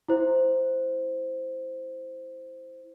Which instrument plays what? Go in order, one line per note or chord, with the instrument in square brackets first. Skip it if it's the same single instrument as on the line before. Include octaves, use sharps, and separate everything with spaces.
[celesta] E4 C5